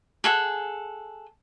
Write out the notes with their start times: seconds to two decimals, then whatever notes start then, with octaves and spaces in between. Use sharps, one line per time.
0.24 G#4 A4 F#5